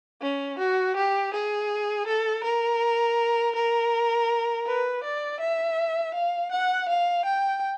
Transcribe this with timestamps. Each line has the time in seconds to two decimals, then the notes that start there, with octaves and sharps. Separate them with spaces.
0.22 C#4
0.59 F#4
0.97 G4
1.34 G#4
2.08 A4
2.44 A#4
3.56 A#4
4.66 B4
5.04 D5
5.40 E5
6.14 F5
6.52 F#5
6.89 F5
7.25 G5